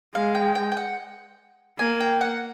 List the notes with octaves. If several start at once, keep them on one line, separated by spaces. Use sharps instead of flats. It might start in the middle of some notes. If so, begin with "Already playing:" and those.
G#3 F5
G5
G5
G5
F#5
A#3 G#5
G5
F#5